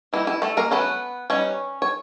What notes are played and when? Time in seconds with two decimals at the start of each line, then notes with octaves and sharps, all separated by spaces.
0.13 E3 G3 A#3 D#4 E4
0.27 E4
0.42 A3 A4
0.57 A#3 A#4
0.71 F#3 A3 B3 C#4 B4
1.30 G3 B3 C#4 D#4 C#5
1.82 C#5